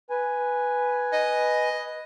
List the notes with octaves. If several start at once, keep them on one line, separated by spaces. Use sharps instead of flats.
B4 G#5
D#5